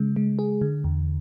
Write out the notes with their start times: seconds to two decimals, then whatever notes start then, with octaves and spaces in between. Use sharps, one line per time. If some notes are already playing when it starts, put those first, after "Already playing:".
Already playing: C#3 G#3
0.16 G#3
0.39 G#4
0.61 D3
0.84 E2